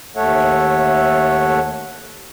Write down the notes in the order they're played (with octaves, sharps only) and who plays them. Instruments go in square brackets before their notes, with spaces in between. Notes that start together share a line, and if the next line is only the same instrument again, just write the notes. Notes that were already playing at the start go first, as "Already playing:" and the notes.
[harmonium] D#2 A3 A4 C#5 E5 F#5